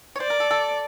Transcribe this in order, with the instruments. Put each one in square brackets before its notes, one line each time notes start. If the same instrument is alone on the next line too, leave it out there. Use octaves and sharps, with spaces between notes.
[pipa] C#5
[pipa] C5 [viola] D5
[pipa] A#4
A4
A4